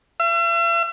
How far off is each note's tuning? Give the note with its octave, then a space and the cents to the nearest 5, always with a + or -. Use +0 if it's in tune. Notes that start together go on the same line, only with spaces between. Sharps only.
E5 +45